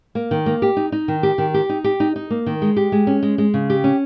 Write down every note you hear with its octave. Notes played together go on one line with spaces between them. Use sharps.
A#3
D#3
A#3
G4
D#4
D#4
D#3
G4
D#3
G4
D#4
G4
D#4
D#4
A#3
D#3
G#3
G4
G#3
C#4
G#3
G#3
C#3
G4
C#4